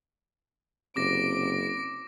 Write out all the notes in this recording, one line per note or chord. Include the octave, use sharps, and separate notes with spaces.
F#1 C3 D6 A#6 D7